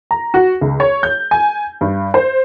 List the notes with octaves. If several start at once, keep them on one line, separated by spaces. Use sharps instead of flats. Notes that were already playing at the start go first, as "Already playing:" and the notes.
A#5
F#4
C#2
C#5
G6
G#5
G2
C5